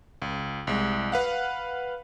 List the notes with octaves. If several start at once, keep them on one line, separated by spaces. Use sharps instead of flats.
C#2
C2 G#3
B4 F5 F#5